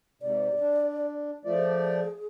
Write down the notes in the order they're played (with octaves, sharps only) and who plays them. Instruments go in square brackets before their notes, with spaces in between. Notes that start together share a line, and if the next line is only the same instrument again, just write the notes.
[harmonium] G#2 C3 [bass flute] D5
[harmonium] D4
[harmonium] F3 A3 D5 [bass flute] F4
[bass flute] G#4